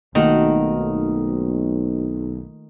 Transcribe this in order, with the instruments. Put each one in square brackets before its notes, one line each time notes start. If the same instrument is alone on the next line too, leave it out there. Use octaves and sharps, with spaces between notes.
[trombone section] B1 [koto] D#3 [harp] A3 A#3 F4 [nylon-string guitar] D#4 F#4